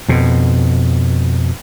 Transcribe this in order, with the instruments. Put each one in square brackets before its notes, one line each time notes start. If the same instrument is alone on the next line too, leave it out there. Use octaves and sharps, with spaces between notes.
[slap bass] F2 B2